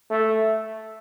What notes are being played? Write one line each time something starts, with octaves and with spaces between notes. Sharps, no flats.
A3